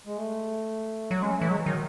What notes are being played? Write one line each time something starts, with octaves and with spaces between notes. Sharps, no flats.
G#3
A3
F#3
G#3 C#4
A3
E3
F#3 G#3
D#3 F#3